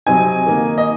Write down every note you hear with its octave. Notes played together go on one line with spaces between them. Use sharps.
C3 F#3 C4 D#4 G#5
D#3 A#3 D#4
D#5